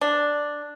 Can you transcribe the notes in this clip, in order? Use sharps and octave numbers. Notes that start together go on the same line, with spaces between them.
D4